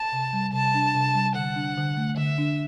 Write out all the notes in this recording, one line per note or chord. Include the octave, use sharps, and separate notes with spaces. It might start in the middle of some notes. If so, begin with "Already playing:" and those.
Already playing: A5
C3
G3
C3 A5
D4
C3
G3
D3 F#5
D4
D3
A3
D3 E5
D4